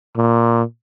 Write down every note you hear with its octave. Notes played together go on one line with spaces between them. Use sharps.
A#2